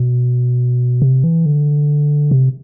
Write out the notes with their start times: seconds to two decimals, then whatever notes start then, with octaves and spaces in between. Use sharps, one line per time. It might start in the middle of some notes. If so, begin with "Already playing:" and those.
Already playing: B2
1.02 C3
1.24 E3
1.46 D3
2.31 C3